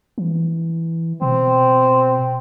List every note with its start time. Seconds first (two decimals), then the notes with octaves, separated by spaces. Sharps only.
0.18 E3
1.22 B2 C4